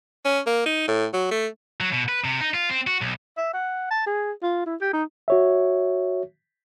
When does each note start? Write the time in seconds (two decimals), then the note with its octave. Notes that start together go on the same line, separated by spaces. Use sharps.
0.25 C#4
0.46 A#3
0.66 D#4
0.88 A2
1.14 F#3
1.31 A3
1.80 F#3
1.92 B2
2.09 B4
2.24 C3
2.41 D#4
2.54 F4
2.69 C4
2.87 F#4
3.01 B1
3.37 E5
3.53 F#5
3.91 A5
4.07 G#4
4.43 F4
4.66 E4
4.81 G4
4.93 D#4
5.28 F#4 C#5 E5